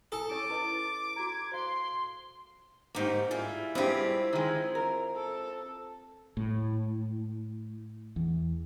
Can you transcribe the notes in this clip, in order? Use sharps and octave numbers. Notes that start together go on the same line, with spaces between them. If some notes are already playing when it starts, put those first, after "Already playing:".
E4 A4 G#5 D#6
C#4 C#5 C#6 D6 A6
E4 B4 D#5
F#4 A#5 G#6
C5 F5 C6
G#2 A#3 D#4 F#4 G4
G3 E4 F4 G#4
G2 G#3 C4 F4 G4
D#3 G#3
A#4
A4
A2
E2